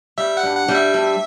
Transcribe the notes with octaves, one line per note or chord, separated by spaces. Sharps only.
G3 E5
F#5
G2
F#5
G3
E5
G2